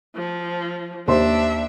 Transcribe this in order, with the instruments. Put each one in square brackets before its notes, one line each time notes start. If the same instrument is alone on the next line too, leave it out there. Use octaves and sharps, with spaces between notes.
[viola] F3
[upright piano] D#2 C5 C6 [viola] D4 E5